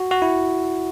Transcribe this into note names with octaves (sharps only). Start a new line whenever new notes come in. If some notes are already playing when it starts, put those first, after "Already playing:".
Already playing: F#4
F#4
E4